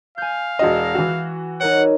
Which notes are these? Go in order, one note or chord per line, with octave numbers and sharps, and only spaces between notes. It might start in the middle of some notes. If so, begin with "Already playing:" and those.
F5 G#5 G6
E1 F#4 D#5
E3 F#4
D#4 A#4 C#5 F#5